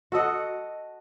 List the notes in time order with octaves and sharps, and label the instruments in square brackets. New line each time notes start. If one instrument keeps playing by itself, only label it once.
[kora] F#4 A4 D#5 F#5